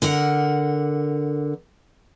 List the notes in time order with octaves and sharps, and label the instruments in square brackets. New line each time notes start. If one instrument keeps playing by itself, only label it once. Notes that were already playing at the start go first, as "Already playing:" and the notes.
[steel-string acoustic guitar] D3 A#4 F#5